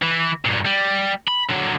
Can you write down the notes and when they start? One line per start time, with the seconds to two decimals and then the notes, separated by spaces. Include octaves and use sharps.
0.02 E3
0.45 G2 A#2
0.66 G3
1.28 B5
1.49 D3 F#3